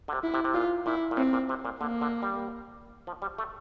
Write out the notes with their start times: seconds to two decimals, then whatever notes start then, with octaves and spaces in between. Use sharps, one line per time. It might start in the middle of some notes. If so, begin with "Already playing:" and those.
0.08 D3
0.13 C3
0.23 E4
0.34 C3
0.44 C3
0.54 A#2 F4
0.86 A#2 E4
1.11 A#2
1.17 A2 C4
1.33 A#2
1.49 C3
1.65 A#2
1.80 D3 A#3
2.01 D3
2.22 G3
3.07 F3
3.22 G3
3.38 A3